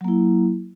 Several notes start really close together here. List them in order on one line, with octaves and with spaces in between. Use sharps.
F#3 A#3 E4